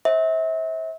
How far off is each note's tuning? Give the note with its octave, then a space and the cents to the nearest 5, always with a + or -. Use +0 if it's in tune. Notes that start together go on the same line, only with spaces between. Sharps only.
C5 +40 E5 -35